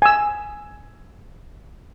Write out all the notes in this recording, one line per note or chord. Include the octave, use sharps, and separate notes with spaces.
G#5 E6